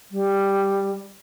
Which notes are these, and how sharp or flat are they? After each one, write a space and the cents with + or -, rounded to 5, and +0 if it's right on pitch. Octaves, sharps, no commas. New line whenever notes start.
G3 +5